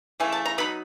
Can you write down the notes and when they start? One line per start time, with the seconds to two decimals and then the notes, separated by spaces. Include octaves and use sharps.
0.20 C#3 E3 A3 G#5
0.32 A5
0.45 A#5
0.58 F#3 B3 D#4 B5